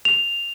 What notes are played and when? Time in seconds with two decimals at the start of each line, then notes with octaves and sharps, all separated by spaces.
0.05 F7